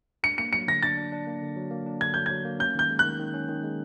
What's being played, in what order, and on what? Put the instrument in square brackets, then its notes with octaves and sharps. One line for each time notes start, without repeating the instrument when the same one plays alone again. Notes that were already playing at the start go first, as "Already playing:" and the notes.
[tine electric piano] D4 [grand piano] C#7
[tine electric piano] A#3 [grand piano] C#7
[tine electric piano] F#3 [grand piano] C#7
[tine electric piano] D3 [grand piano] A#6
[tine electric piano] D4 [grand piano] A6
[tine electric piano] D4
D4
A#3
D3
F#3
A#3
D4
[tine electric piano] D3 [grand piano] G#6
[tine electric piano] F#3 [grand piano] G6
[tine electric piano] F#3 [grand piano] G#6
[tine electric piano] A#3
[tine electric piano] C#4 [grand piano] G6
[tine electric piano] D#3 [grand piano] G6
[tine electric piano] G#3
[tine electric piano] D#3 [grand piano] F#6
[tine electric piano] D#3
C#4
D#3
G#3